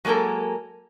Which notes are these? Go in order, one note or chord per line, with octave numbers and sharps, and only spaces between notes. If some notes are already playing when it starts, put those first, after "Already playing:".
F#3 G#3 A#3 A4 A#4